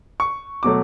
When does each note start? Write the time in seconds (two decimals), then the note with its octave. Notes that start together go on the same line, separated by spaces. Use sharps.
0.20 C#6
0.63 B2 F#3 A3 D6